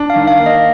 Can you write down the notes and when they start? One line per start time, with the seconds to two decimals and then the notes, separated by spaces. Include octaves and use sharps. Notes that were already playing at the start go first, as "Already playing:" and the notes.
Already playing: D4
0.10 F5
0.16 D#3
0.28 F5
0.40 A#3
0.46 D#5